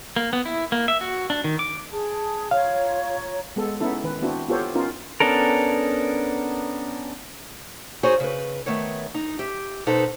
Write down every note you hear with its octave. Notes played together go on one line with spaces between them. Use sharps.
A#3
B3
E4
A#3
E5
F#4
D4
D#3
D6
G#4 A5
F4 C#5 F5 A#5
G#3 B3 A4
B3 C#4 D#4 E4 A4
D#3 B4
B3 C4 D4 E4 F#4
B3 F4 G4 A4 C5 C#5
B3 C#4 D#4 F4 A#4
B3 C#4 D4 A4 A#4
D#4 F#4 G#4 C5 C#5
C#3 B4
D#3 A3 B3 C#5
D#4
G4 E5
B2 D#4 A4 B4 C5